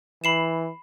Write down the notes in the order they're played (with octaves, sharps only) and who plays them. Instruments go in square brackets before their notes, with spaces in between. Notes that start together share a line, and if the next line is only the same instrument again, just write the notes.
[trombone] E3 [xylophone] B5 C7 E7